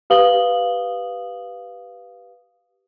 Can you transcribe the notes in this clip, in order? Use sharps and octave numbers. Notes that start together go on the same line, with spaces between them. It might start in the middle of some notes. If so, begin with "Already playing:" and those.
G4 B4 F5 D#6 F#7 G7